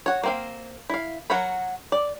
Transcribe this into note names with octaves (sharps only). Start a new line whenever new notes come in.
F#4 C#5
A#3 C4 F5
E4 F5
F#3 F#4 A#4 C#5 B5
D5